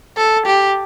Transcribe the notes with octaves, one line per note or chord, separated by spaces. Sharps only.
A4
G4